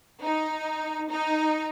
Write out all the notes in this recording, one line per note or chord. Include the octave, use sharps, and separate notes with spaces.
D#4
D#4